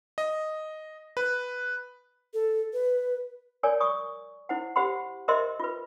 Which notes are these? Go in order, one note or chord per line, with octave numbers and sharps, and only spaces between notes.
D#5
B4
A4
B4
A#4 C#5 D5 G#5
C#6 D#6
E4 C5 F#5
G4 C5 F#5 B5 C6
A#4 C5 D#5 E5 C6
F4 B4